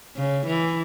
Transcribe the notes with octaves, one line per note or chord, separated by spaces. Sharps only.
C#3
E3